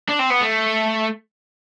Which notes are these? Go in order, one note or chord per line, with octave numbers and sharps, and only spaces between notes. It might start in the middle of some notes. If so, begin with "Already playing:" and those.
D4
C4
B3
A3